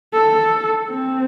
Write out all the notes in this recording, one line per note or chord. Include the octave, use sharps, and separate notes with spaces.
A4
C4